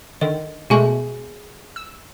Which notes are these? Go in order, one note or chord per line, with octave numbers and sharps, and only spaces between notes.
D3 D#3 D#5
B2 G#3 A3 G#4 G#5 C#6
E6